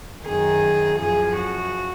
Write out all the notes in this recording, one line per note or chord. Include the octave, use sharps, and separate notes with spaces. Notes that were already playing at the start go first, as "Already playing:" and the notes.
F#2 D#3 G#4
F#2 F3 G#4
F#4